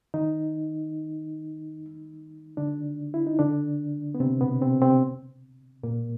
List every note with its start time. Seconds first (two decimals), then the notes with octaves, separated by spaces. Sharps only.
0.14 D#3 D#4
2.57 D3 D4
3.14 E4
3.27 D#4
3.39 D3 D4
4.15 B3
4.20 C3 C4
4.41 B2 B3
4.62 C3 C4
4.82 C3 C4
5.83 A#2 A#3